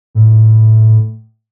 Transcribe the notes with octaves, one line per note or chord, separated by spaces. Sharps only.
A2